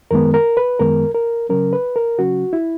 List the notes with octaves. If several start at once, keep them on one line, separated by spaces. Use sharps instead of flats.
F#2 D#3 G#3 B3 A#4
A#4
B4
F#2 D#3 G#3 B3 A#4
A#4
C#3 F#3 C#4 A#4
B4
A#4
C#3 F#3 C#4 F#4
E4